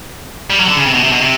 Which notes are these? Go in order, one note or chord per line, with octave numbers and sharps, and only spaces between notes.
G3
F#3
D3
C#3
C3
B2
C3
B2
C3